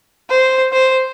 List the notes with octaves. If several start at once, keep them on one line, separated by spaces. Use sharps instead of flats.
C5
C5